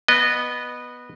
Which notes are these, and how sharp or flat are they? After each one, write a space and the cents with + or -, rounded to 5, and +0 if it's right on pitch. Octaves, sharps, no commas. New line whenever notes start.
B3 -5 D#5 -25